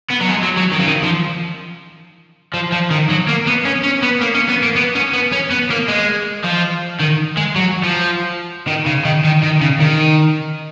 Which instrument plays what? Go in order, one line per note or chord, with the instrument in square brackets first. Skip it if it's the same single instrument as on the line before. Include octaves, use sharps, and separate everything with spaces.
[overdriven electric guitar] B3
F#3
G#3
F#3
F#3
D#3
C#3
D#3
F3
F3
F3
D#3
F#3
A#3
B3
C#4
C#4
B3
A#3
C#4
B3
A#3
B3
C#4
B3
C#4
B3
A#3
G#3
F3
D#3
G#3
F#3
F3
D#3
C#3
D#3
D#3
D#3
C#3
D#3